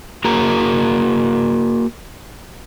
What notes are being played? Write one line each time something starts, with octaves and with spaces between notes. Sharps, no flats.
A#3 F#4 G#4 A#4 A#5